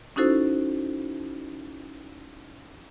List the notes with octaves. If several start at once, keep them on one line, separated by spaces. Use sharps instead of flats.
C#4 D#4 E4 F#4 A4 C5